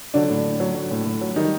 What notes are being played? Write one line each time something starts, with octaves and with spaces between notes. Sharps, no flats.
D3 F#3 D4
A2
A2
F#3
F#3
A2
A2
F#3
D#3 G3 D#4